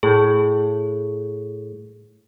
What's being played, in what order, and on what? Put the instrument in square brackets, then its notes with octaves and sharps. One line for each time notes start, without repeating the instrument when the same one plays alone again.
[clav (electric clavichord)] A2 [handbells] G#4